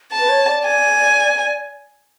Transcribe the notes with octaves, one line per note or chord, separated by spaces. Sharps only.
A5
B4
C#5
D5
G#5